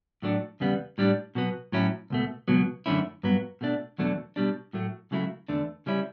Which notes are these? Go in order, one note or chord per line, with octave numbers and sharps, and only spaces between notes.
A2 F#3 A3 D4
E2 C#3 G3 B3
A2 G3 D4
B2 F#3 B3
A2 F#3 C#4 E4
C#2 B2 A3
C#2 B2 F#3 B3
F#2 D3 A3 C#4 E4
G2 F#3 B3
B2 A3 D4
E2 B2 F#3 A3 D4
B2 G3 D4
A2 F#3 A3
C#2 C#3 F#3 A3 E4
E2 D3 A3 D4
C#3 G3 C#4 E4